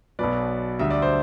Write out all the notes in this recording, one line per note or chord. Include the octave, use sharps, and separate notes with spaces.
B1 B2 F#3 B4 D5
D2 D3 G3 E5
D5
C5